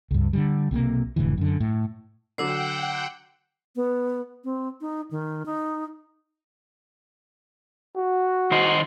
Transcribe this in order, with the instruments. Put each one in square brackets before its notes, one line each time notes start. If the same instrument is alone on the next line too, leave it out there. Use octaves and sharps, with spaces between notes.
[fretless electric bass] C#2 G2
D3 E3 G3
B1 C3 F3 A#3
F1 A2 D3 E3
F#2 D3
A2
[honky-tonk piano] D3 F#3 [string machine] F#5 G5 [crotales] D6 E6 C7
[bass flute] B3
C4
D#4
D#3
D#4
[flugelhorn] F#4
[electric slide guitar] D#3 C5 D#5